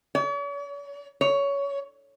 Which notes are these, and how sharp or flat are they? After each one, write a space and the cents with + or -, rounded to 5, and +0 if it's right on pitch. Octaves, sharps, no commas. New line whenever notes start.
C#5 +45
C#5 +15